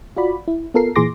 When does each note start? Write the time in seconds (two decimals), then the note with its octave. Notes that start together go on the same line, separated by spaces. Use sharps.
0.17 F4 F#4 D5 B5
0.48 E4
0.74 B3 F4 A4 A#4 C7
0.96 A#2 E3 G#4 C6 D6 A#6